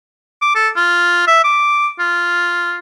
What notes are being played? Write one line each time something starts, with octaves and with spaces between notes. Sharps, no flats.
D6
A4
F4
E5
D6
F4